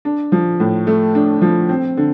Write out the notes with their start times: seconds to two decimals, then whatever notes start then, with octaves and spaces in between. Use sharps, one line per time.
0.05 D4
0.32 F3
0.60 A2
0.87 A3
1.15 D4
1.42 F3
1.69 C4
1.97 D3